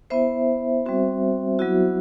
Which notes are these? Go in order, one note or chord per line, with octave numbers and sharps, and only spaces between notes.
B3 E4 C5 E5
G3 C4 F#4
F#3 B3 E4 F#4